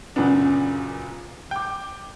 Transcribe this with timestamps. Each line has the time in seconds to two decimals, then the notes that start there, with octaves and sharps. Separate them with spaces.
0.16 F#2 A#2 C#3 B3 D4
1.51 G5 D6